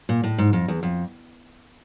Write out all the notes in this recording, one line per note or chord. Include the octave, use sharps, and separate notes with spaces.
A#2
A2
G#2
F2
E2
F2